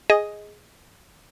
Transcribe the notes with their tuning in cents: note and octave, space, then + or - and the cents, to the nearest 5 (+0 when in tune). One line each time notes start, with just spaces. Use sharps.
G#4 +0 D#5 +5